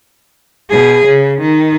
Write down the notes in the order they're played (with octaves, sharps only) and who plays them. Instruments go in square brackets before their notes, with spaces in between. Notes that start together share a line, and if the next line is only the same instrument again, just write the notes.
[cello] B2 G#4
C#3
D#3